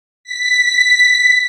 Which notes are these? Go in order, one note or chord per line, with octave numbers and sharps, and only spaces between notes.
B6